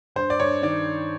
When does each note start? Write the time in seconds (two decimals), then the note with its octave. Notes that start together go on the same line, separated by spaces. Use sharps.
0.16 G2 C5
0.30 D5
0.40 G2 C#5
0.62 D#3 D5